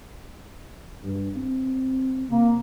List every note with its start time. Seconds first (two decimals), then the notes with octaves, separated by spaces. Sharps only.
1.04 G2
1.36 C4
2.29 C3 A#3